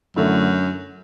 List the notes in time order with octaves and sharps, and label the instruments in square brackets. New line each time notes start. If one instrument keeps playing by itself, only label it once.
[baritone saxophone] F#2 [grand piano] D3 A3 E4